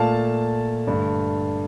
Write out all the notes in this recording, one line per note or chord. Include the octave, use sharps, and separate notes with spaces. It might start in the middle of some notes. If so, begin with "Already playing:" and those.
Already playing: A#2 A3 F5 A5
G2 D3 A3